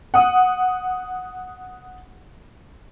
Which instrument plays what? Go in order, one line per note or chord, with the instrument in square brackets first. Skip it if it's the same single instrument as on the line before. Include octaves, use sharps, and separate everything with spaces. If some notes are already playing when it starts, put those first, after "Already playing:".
[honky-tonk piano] F#5 D#6